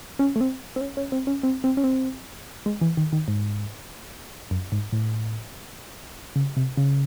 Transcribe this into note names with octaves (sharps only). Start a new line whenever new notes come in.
C#4
A3
C4
C4
C#4
C#4
C4
C#4
C4
C4
C#4
C4
G#3
E3
D#3
D#3
G#2
F#2
G#2
A2
C#3
C3
C#3